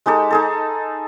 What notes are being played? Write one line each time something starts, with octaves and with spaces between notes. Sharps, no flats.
G#3 D#4 G4 A4
D#4 G#4 A4